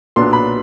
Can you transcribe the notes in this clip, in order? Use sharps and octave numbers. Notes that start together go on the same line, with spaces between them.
B1 A#2 F#3 B3 D4 C6
B5